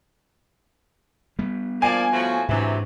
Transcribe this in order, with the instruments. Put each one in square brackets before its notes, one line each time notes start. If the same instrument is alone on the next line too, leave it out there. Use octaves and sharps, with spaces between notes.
[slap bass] G3 B3
[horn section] F3 A#3 D5 [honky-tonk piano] G#5
[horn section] A2 F3 F#4
[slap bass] G#2 D4 [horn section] C3 E3 F#3